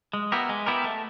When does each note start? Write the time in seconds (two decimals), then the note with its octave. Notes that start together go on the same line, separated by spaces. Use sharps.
0.13 G#3
0.32 B3 E4 G4 A#4
0.49 G#3
0.66 B3 E4 G4 A#4
0.84 A3